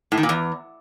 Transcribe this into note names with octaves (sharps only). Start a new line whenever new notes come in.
A2
D#3
A#2
E2